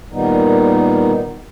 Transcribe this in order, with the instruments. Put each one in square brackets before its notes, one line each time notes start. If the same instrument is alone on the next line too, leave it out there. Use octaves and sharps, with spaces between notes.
[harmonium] A#2 D#3 G3 B3 D#4